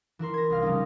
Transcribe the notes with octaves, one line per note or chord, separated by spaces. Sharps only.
E3 E4 A#4 C6
G#6 A#6
C2 F5 F6
C#3 F3 G3 C#4 D#4